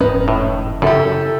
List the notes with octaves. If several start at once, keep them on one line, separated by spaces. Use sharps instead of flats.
F1 G#2 D#3 C#4 D#4 B4
A2
F#2 C#3 E4 G4 A4